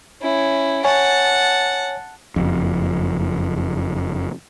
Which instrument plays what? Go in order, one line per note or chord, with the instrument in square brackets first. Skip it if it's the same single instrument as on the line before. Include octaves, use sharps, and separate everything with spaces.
[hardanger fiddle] C#4 E4
[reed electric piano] C#5 G#5 [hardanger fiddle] F#5 A5
[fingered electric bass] F#1 F2